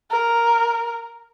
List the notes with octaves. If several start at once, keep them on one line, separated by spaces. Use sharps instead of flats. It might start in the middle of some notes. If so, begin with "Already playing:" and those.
A#4